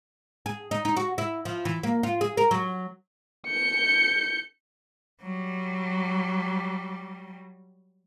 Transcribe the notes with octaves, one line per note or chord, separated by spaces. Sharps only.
G#4
D#4
D#4
F#4
E4
F3
E3
A#3
F4
G#4
A#4
F#3
G6 C#7
F#3 G3